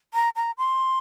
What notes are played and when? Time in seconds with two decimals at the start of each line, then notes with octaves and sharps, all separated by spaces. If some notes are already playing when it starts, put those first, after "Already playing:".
0.14 A#5
0.36 A#5
0.58 C6